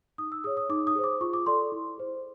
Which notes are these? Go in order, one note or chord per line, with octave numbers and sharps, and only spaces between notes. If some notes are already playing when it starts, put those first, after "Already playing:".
D#4 D#6
E6
G#4 C#5 D#6
D#6
D#4 D6
D#6
G#4 C5
D6
F4 C#6
D6
A4 D5 C6
E4
G#4 C5